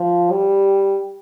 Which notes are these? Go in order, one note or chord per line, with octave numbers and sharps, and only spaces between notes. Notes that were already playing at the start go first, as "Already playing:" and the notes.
Already playing: F3
G3